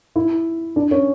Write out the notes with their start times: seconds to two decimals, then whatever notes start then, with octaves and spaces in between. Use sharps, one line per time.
0.16 E4
0.76 D4
0.91 C#4